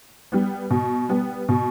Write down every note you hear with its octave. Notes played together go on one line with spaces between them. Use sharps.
G3 B3
B2
G3 B3
B2